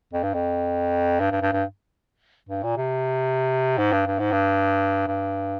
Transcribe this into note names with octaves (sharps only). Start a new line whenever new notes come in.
F2
G2
F2
G2
G2
G2
G2
G2
A#2
C3
G#2
G2
G2
G#2
G2
G2